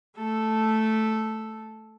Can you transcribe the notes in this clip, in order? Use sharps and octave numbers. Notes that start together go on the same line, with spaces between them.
A3 A4